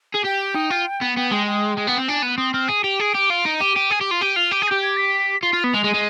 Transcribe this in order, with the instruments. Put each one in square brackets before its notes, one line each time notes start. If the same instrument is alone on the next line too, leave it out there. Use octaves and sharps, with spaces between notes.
[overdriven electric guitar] G#4
[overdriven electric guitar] G4 [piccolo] G5
[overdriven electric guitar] D#4
F4
B3
[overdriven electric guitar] B3 [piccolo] G5
[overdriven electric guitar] G#3 [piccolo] G5
[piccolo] G5
[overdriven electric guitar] G#3
B3
C4
[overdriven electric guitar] D4 [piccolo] G#5
[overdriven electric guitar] B3
[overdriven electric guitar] C4 [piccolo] D#6
[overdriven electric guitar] C4 [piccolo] F6
[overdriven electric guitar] G#4 [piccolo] D#7
[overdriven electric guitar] G4 [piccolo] F7
[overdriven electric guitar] G#4 [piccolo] D7
[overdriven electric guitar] G4
F4
D#4
[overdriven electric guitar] G4 [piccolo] D#7
[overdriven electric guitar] G4
G#4
G4
F4
[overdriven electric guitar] G4 [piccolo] D#7
[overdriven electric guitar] F4 [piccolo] F7
[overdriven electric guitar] G4 [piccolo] D#7
[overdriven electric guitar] G#4
[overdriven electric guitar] G4 [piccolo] G6
[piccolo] G#6
B6
[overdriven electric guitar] F4 [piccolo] C7
[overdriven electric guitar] F4
B3
[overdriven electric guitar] G#3 [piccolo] F7
[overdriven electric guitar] G#3
[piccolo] D#7
[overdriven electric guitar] G#3